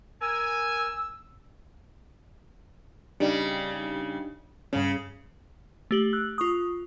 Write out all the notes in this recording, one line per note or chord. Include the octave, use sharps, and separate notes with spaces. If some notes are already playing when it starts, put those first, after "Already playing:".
A#4 G#5 E6
C#3 G3 D4 D#4 G4
G2 C#3 C#4
A3 G4 F#7
E6 F#6
F4 C#6 D#6